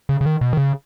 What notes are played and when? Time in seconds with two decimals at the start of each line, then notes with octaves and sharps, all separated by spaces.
0.09 C#3
0.21 C#3
0.25 D#3
0.41 B2
0.53 D#3
0.57 C#3